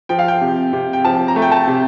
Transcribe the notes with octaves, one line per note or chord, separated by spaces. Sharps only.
F3 G5
F5
G5
C3
C3
G5
F3 A5
A#5
A3
G5
A5
C3